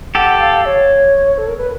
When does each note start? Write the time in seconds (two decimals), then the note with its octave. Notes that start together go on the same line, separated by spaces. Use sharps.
0.15 G4 A4 F#5
0.40 F5
0.65 C#5
1.38 A4
1.47 A#4
1.57 B4